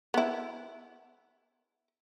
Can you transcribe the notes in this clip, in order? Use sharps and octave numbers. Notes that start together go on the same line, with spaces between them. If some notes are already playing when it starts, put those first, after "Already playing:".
B3 E4